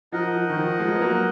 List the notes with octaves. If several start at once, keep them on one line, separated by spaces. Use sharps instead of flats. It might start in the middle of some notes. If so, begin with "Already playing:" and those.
F3 D#4 A#4 D#5 F#5
F3
D#3
F3
F3 G#3
B3
F#3 A#3